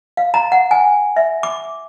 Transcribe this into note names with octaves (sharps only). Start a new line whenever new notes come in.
F5
A#5
F#5
G#5
E5
D6